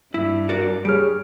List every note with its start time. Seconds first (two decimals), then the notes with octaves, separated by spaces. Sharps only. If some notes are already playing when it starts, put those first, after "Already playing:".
0.14 G2 E4
0.49 F#4 A#4 D5
0.85 G3 G4 G#4 C#5 F6 D7